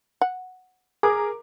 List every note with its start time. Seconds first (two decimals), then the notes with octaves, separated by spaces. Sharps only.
0.21 F#5
1.03 G#4 A#4 D6